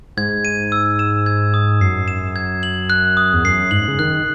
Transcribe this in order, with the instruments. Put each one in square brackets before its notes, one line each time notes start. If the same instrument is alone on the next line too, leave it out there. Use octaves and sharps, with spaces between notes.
[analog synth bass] G#2 [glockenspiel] G#6
[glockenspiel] D#7
E6
E7
G#6
D#6
[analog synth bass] F#2 [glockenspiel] C7
[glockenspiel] E7
G#6
F#7
F#6
D#6
[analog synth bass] E2
[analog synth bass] F#2 [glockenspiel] C7
[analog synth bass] G#2 [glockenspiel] F#7
[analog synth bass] C#3
[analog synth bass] D#3 [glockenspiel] F#6